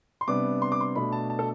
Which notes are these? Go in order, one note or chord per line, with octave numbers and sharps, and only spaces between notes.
C6
C3 G3 B3 D4 D6
C6
D6
C6
B2 A3 D4 B5
A5
A5
A4